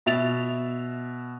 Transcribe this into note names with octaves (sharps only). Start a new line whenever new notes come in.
B2 E5 A6 F7